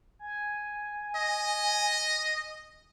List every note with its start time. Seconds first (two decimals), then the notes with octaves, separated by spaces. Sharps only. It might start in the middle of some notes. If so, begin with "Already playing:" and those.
0.19 G#5
1.15 D#5